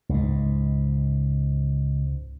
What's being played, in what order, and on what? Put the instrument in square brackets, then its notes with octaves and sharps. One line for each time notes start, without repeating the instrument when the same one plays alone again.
[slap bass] C#2 G#2